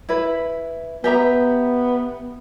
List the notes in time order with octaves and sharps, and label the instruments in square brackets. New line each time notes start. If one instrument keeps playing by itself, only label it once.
[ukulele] E4 B4
[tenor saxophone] B3 [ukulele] G4 E5 A#5